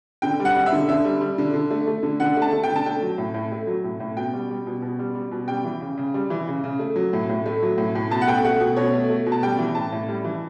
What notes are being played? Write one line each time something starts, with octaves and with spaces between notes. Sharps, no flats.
D3 G5
G3
F#5
G3
E5
D3
D3 E5
G3
G3
D3
D3
A3
A3
D3
D3 F#5
A3
A5
A3
G5
D3
A5
A3 G5
F#3
A2
A2
A3
F#3
A2
A2
B2 G5
G3
G3
B2
B2
G3
G3
B2
G3 G5
E3
C#3
C#3
G3
E3
C#3
C#3
A3
F#3
A2
A2
A3
F#3
A2
A2
B2 A5
F#5
A3 G5
A3 F#5
B2
B2 C#5
A3
A3
B2
A5
G3 G5
E3
A2 A5
A2
G3
E3